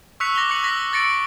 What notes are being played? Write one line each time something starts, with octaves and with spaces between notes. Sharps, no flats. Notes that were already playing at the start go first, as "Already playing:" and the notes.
C#6 E6 F#6 B6 C#7 F7
D6 A#6 F7 G7
C#6 F#6 C#7 F#7
E6 A#6 B6 F#7
E6 A6 A#6 C#7 D7